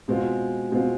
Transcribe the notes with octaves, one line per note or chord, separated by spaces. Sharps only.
B2 G#3 C4 F4
B2 G#3 C4 F4